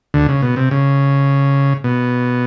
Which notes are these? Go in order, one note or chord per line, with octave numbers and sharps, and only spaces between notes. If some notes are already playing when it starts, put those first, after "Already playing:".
D2 D3
C#3
B2
C3
C#3
B2